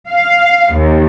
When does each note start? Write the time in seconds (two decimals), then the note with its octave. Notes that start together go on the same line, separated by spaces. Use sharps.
0.10 F5
0.74 D#2